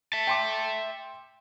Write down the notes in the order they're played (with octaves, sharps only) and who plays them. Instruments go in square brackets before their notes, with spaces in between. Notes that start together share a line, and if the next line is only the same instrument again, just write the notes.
[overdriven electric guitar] E5 A5
[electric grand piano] G5 C6 D6